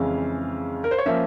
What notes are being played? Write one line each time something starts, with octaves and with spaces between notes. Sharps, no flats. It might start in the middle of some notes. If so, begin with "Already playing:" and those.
Already playing: F2 C#3 E3 G#3 C#4 F5
A#4
C5
C#5
F3 A#3 C#4 E5